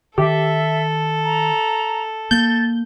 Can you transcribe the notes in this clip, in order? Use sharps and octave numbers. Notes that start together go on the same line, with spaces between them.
D#3 G4 A4 E5
A#5
A#3 G6 A6